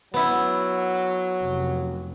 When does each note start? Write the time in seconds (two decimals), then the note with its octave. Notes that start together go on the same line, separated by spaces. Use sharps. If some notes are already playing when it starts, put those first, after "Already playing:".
0.14 F#3 B3 E4
1.44 F1